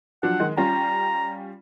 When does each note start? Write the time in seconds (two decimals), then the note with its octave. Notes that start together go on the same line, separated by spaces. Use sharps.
0.23 F3 F#3 D4 F#5
0.40 D#3 G#3
0.57 G3 C#4 F4 A#5